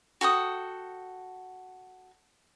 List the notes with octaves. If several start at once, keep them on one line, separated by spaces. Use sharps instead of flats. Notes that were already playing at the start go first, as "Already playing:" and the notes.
F#4 A4 G5 D#6